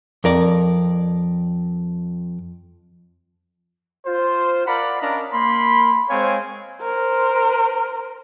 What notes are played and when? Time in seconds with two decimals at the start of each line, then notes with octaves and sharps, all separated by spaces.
0.24 F2 A#4 D5
4.06 F4 C5
4.66 A#4 D5 F5 F#5 A#5 B5
5.00 C#4 D4 A#4 D#5 F5 A#5
5.32 A#3 B5 C6
6.09 G#3 C4 C5 C#5 F5 G#5
6.81 A#4 C5